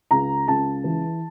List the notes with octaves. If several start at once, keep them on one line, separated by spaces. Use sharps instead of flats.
C#2 A#5
C#2 A5
E3